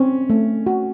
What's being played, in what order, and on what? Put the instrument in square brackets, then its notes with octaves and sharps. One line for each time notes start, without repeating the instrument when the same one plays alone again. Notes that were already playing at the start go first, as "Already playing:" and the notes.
Already playing: [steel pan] C4 [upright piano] C#4
[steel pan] A3
F#4